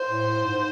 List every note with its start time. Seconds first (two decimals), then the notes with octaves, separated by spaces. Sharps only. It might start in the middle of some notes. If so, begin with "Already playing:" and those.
Already playing: C5
0.08 A2
0.45 G#2